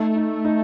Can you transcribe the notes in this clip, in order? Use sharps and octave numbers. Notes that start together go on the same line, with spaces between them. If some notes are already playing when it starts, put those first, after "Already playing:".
Already playing: A3 D#4
D#4
D#4